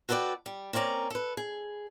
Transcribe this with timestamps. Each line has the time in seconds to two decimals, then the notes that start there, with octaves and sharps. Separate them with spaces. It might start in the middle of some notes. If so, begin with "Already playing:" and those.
0.09 F#4 A4 B4 C5 D5 G5
0.46 G3
0.73 A#3 C4 C#4 D5 A#5
1.10 A4 B4
1.37 G#4